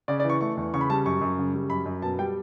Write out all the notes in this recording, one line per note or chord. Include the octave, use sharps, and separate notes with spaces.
C#3 D5
D5
E3
C#6
A3 C#6
E2
C#3 C#6
B5
G3 A5
F#2 C#6
F#2
C#3
G3
F#2 B5
F#2
B2 A5
G3 G5